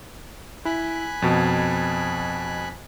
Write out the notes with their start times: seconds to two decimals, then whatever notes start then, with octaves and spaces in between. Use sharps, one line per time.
0.65 E4 G#5 B5 F#6
1.22 F2 B2